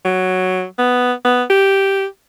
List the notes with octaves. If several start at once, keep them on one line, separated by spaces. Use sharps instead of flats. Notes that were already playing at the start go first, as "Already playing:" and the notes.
F#3
B3
B3
G4